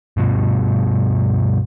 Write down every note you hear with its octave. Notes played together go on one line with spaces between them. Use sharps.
G2 B2 F3